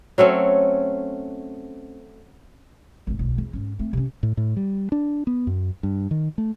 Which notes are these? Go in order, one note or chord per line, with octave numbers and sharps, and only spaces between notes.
F#3 A3 C4 C#4
G#1 A2
D1 B1
E2
G#2 C#4
A3 C4
C3 C#4
A2
A2
G3
D4
B3
F#2
G2
D#3
A3